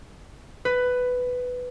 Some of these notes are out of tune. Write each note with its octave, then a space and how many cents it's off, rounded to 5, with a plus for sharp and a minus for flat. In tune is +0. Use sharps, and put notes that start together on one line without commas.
B4 +10